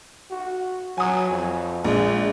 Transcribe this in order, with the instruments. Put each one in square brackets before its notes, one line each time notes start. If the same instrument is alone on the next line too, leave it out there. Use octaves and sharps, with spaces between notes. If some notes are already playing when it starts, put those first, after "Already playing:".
[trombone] F#4
[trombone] F#3 [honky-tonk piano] G#5 D#6
[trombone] F2
[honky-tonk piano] A#1 [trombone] G#3